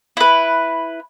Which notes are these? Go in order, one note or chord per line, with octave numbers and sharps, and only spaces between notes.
E4 B4